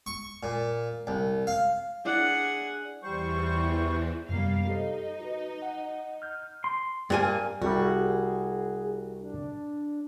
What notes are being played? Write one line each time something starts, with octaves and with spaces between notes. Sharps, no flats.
C#6
A#2
C2
F5
D4 E4 G#4 F#5
E2 E3 G3 C5 C#6
F#2 C3 G3 A#3 B3 F5
D#4 G4 A4 C5
F#4 B4
F#5
F6 G6
C6
G2 A#3 G#5
C2 G3 F#4 G#4
D4